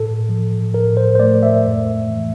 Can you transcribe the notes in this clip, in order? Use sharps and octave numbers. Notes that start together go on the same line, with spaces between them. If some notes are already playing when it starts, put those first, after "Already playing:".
Already playing: A2 A4
F3
A2 A#4
C5
C5
A3 D5
E5
F2
E3